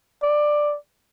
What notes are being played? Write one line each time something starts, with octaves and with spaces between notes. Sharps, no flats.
D5